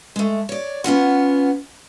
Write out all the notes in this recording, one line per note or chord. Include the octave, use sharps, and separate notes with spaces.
G#3 A3
C#5 D5
B3 C#4 F4 F#5